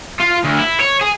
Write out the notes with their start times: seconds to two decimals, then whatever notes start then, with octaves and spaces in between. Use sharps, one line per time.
0.20 F4
0.44 D2
0.58 E4
0.80 C#5
1.01 G#4